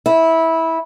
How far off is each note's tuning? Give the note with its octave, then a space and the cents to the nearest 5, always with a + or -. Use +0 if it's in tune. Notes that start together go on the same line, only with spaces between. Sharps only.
E4 -15